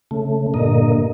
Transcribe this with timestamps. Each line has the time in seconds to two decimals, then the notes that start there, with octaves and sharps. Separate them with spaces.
0.11 C#3 A3
0.54 G2 A#2 D3 A#3 D#5